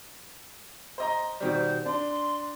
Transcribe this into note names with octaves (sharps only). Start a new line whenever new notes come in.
C5 D#5 A#5
B2 D#3 G3 C5
D4 C6